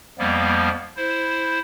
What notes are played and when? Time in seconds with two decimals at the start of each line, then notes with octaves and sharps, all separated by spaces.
0.19 F2 F3 G3 A#3 B3
0.97 E4 C5